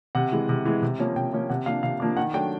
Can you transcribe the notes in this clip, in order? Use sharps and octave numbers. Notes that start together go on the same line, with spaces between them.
C3 F#5
E3 G#3
C3
E3 G#3
C3
F3 A#3 C#4
C3 G5
F3 A#3 C#4
C3 F#5
F3 A#3 D4 F5
C3 F5
F3 A#3 D4
D#3 F#5
F#3 A3 D4 G5